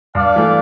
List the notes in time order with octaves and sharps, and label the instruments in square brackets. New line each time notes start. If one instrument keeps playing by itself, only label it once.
[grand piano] G2 [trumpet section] D5 F5
[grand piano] E3 A3